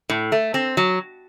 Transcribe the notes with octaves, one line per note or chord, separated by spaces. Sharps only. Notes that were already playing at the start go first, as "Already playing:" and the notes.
A2
A3
C4
F#3